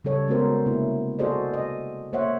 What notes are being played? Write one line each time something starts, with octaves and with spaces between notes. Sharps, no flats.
C#3 G3 A4 C#5
G#3 B3 C#4 F#4 A#4 C5
C3 A#3 E4
F#4 G#4 A4 C5 D5 D#5
D#5
A#3 C5 C#5 E5 F#5